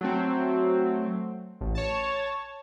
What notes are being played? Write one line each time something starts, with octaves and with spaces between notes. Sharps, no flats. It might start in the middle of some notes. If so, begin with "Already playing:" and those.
F#3 A3 C4
A1
C#5 A5